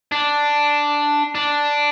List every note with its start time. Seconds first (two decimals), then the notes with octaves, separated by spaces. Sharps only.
0.12 D4
1.35 D4